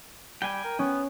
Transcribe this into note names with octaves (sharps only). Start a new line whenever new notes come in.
G3 G5 G#5 D7
A#4
B3 C#4